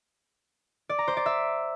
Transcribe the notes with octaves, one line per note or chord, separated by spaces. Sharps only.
D5
A#5
C5
D5
E5